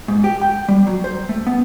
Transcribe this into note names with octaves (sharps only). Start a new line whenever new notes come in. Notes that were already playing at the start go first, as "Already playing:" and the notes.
G#2
G4
G5
G3
F#3
C5
A3
B3